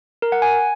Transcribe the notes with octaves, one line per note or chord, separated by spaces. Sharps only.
A#4
F#5
G#5